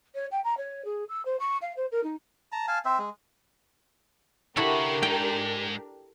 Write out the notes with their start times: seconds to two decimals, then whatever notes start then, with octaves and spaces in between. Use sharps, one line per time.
0.14 C#5
0.31 G5
0.44 A#5
0.57 C#5
0.84 G#4
1.09 E6
1.25 C5
1.39 C#6
1.61 F5
1.76 C5
1.91 A#4
2.03 D#4
2.52 A5 A#5
2.68 F5 G#5 A5
2.85 C4 C5 E5
2.99 G#3
4.57 C#3 D4 E4 F#4 G4 A4 A#4 B5
5.03 G#3 D#4 G5